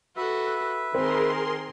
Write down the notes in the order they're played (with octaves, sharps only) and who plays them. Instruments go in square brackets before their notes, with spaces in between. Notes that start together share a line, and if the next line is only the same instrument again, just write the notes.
[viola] F#4 A4 [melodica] B4 E5
[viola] D#3 [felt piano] C4 [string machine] G#4 A#4 C6